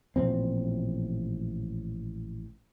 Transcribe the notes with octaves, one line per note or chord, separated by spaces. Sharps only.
A1 A#2 F3 C4